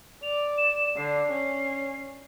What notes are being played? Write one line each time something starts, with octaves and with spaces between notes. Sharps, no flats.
D5 F7
E7
D3 C7
C#4